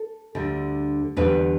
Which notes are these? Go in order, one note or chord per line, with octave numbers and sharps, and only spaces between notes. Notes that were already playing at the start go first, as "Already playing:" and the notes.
Already playing: A4
D2 D3 G3
E2 D3 G3 B4